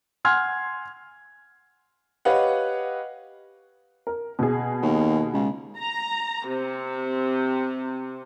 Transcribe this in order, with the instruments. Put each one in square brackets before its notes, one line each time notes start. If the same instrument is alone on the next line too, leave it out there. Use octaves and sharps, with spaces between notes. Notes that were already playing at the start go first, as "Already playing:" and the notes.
[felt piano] F#5 G#5 C6 F6 G#6
[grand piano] G4 B4 C#5 D#5 F5 F#5
[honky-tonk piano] A#4
B2 G#4
[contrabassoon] D#2
C#2
[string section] A#5
C3